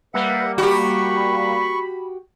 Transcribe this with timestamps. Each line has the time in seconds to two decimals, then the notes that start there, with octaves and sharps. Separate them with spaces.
0.14 G3 A#3 B4 E5 F#5
0.58 F#4 G4 B5 C#6